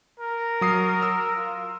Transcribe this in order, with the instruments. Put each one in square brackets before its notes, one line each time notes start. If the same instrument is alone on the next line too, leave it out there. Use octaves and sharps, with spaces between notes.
[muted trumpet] A#4
[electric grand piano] F#3 D#6 C7
E6
[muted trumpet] F4